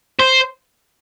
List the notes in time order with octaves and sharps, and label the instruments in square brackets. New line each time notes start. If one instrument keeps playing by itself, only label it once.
[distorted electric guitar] C5